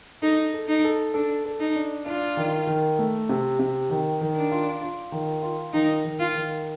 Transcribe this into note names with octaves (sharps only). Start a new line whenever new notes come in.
D#4 A4
A4
D#4
A4
D4 A4
A4
D#4
D4
D4 F4
D#3
D#3
A3
C3
C3
D#3
D#3
D4
F4
F4
D#3
F4
D#3 D#4
D#3
F4
D#3